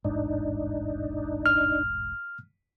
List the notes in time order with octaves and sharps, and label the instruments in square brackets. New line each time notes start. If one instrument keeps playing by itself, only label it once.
[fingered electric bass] E1 A1 G#2 [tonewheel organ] D4 D#4
[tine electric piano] F6